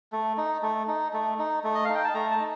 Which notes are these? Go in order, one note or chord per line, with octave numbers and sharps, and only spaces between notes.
A3
D#4
A3
D#4
A3
D#4
A3
D#5
D#4 F5
G5
A5
A3 A#5
A5
D#4